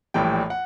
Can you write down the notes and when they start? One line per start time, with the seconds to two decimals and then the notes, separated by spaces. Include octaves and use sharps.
0.14 A#1 A2 E3 G3 G5
0.50 F#5